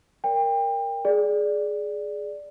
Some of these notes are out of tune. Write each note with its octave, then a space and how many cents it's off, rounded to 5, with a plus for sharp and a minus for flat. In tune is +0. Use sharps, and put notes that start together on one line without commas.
A#4 +0 D5 -35 G5 +25
G#4 +15 D5 +0